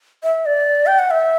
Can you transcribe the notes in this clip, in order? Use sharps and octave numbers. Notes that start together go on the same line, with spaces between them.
E5
D5
G5
F#5
E5